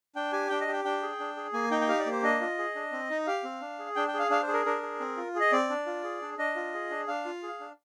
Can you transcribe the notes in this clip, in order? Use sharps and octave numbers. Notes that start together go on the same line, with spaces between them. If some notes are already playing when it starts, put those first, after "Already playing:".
D4 G5
G4 G#5
D4 G5
D#5
G4 G5
D4 G5
G#4
D4
G#4
A#3 G#5
D#4 G5
G5
G4 F5
D5
A#3
C5
D4 D#5
F4
G#4
D4
C4
D#4
G4 F5
C4
D4
G#4
D4 G5
G5
G#4 F5
D4 F5
C5
G#4
A#4
D4 A#4
G#4
C4
F4
G#4 D#5
C4 D5
D4
F4
G#4
D4
D4 D#5
F4
G#4
D4
D4 F5
F4
G#4
D4